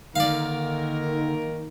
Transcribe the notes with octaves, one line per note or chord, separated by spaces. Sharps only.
D3 D#3 A#3 A#4 D5 F5